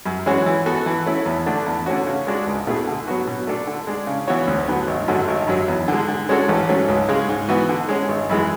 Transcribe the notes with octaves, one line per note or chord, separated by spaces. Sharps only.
F#2
E3 G#3 C#4 F#4
E3
B3 F#4 A4
E3
A3 C#4 E4
E2
D3 A3 D4
E2
D3 A3 C#4 F#4
C#3
G#3 D4 F#4
C#2
B2 A3 E4 G#4
D3
F#3 B3 F#4 B4
B2
A3 D4 A4
D3
G#3 D4
C#3
E3 B3 F#4 C#5
D2
D3 F#3 B3
G#1
F#2 D3 F#3 A3
G#1
F#2 D3 F#3
E2
D3 G#3
D3
G#3 C#4 F#4 A4
A1
G#2 F#3 A3 C#4
C#2
C#3 G#3
G#2
E3 B3 F#4 B4
D3
G#3 C#4
G#1
F#2 E3 G#3